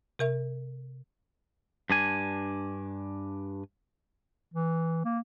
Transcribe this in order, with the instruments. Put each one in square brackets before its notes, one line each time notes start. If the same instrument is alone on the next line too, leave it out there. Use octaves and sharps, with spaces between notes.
[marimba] C3 A#4 E5
[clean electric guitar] G2 D4 G#5
[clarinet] E3
A#3